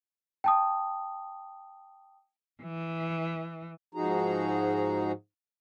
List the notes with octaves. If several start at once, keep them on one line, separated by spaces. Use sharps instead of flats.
G5 A5 D#6
E3
G#2 F3 D#4 F#4 G#4 A#5